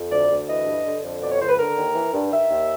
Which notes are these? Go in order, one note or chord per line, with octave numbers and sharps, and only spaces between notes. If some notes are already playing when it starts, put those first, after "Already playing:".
Already playing: F2
D2 D5
D2
E3 D#5
G2
D3
F2
B2 D5
C#5
C#2 C5
B4
D3 A#4
D#2
E3
G2
D#3 E5
D#2